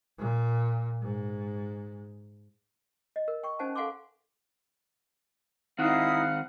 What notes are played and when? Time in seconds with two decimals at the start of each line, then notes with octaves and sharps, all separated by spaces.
0.18 A#2
1.01 G#2
3.16 D#5
3.28 A#4
3.43 G5 C#6
3.59 C#4 D#4 C5 F#5 G#5 A5
3.76 A4 F5 F#5 G#5 C6 D6
5.79 D#3 C4 D#4 E4 F5 F#5 D#6